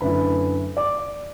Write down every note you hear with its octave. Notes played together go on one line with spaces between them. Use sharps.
F#2 D3 A3 C#4 E4 B4 B5
D5 D6